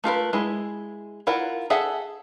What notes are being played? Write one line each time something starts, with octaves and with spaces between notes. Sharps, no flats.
A3 F4 A#4 B4
G#3 E4
E4 F4 A#4 F#5
G#4 A4 E5 F#5